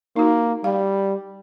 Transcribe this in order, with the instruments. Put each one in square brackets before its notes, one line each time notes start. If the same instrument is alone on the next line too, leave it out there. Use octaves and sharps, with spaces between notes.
[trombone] A#3 [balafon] D#4 F#4
[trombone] G3 [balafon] F5